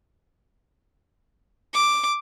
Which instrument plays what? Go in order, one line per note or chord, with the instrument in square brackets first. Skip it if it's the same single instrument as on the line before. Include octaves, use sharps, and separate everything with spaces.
[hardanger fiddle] D6